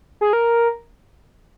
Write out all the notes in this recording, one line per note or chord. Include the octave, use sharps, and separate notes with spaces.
G#4
A#4